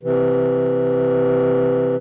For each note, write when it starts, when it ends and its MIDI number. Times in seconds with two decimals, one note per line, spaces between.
0.03 1.96 48
0.03 1.96 52